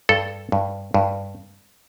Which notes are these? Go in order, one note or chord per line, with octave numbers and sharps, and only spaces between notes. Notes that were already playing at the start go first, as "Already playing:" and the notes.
G2 A4
G2
G2